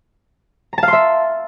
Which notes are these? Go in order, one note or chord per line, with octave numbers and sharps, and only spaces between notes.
E5 F5 A5 A#5 C6